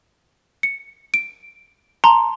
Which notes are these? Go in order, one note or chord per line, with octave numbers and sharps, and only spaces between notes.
C#7
D7
A5 A#5 C6